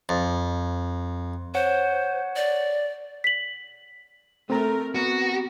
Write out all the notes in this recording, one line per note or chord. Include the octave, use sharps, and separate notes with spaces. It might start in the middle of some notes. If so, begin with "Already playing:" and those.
F2
C5 C#5 F#5
D5
B6 F#7
A3 C4 A#4 A#5
B3 F#4